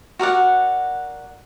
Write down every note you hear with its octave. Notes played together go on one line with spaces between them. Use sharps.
F#4 A#4 D5 F#5